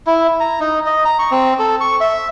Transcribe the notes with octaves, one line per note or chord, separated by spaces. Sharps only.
E4
A#5
D#4
D#5
A#5
C#6
C4
A4
C#6
E5